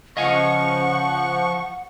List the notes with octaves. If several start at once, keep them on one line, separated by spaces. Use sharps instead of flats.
C#3 F3 D#5 F5 F#5 G#5 C#6